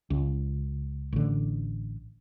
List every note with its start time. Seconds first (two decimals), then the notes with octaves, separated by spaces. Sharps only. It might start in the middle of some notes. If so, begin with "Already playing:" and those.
0.10 C#2
1.13 A1 D3